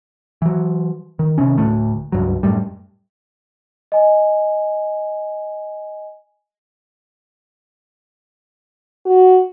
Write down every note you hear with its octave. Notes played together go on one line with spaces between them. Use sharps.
E3 F#3
D#3
C3 D#3 C#4
D1 D2 A2 A3
C#2 G2 F#3
F#2 A2 G3
D#5 G#5
F#4